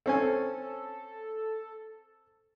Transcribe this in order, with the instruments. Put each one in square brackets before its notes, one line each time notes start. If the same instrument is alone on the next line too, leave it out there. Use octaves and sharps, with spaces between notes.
[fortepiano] C4 C#4 G#5 [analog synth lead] A4